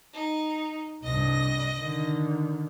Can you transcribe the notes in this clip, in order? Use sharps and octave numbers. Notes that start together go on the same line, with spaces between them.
D#4
C2 G2 D#5 A#6
D3 D#3